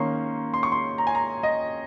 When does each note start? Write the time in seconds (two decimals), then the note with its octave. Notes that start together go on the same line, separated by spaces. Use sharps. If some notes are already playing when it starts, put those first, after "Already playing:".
Already playing: D#3 A#3 C#4 C6 C#6
0.54 C6
0.63 C#6
0.72 C6
0.98 A#5
1.07 G#5
1.15 A#5
1.43 D#5